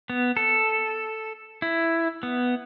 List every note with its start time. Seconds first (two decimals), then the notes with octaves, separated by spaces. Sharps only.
0.10 B3
0.37 A4
1.62 E4
2.23 B3